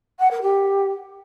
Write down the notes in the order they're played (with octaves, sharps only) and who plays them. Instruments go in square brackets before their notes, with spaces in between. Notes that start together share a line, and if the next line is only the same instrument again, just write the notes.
[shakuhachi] F#5
A#4
G4